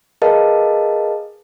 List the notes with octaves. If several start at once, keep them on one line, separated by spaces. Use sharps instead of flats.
G#4 A#4 B4 D#5 F5 A5